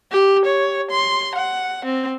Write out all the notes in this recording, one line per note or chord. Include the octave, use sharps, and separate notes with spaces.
G4
C#5
C6
F#5
C4